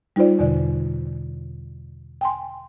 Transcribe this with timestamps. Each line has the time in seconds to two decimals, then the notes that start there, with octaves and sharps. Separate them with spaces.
0.16 G3 D#4 F4 C5 D5
0.39 E2 B2 D3 D5
2.21 G5 G#5 C6